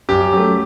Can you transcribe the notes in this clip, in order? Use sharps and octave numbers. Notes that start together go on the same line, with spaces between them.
F#2 G4
F#3 A3